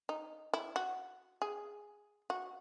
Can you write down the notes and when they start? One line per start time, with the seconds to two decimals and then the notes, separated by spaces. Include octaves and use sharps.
0.09 D#4
0.54 E4
0.76 F#4
1.42 G#4
2.30 F#4